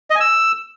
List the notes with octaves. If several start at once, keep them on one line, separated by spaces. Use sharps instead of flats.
D#5
G#5
E6